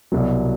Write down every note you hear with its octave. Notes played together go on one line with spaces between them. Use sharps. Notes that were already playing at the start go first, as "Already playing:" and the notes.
C2 B2 F#3